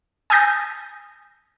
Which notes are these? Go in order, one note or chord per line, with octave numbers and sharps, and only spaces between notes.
G#5 D#6 E6 G6 A6 A#6